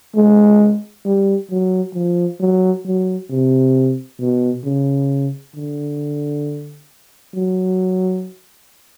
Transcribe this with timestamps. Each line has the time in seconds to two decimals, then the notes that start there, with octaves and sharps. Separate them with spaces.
0.15 G#3
1.05 G3
1.50 F#3
1.95 F3
2.40 F#3
2.85 F#3
3.29 C3
4.20 B2
4.64 C#3
5.55 D3
7.34 F#3